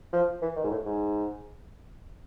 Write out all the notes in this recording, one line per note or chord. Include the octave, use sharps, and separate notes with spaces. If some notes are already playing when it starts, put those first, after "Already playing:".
F3
E3
D#3
G#2
A2
G#2